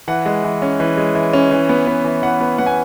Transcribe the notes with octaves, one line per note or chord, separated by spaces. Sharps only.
E3 F#5
G#3
E3
C#4
E3
G#3
E3
C#4
E3
B3
B3
E3
E3 F#5
B3
B3 F#5
G#5